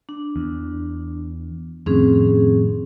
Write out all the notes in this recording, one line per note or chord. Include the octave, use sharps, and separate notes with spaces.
D4
E2
F2 A2 D#3 C4 C#4 G#4